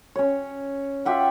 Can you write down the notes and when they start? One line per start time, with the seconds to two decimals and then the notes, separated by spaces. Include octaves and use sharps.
0.15 C#4 C#5
1.05 F4 G4 E5 F#5